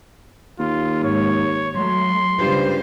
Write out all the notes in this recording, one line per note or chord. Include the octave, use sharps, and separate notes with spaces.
D#2 F4
G#2 C#5
F#3 A3 C6
G2 C#3 F4 C5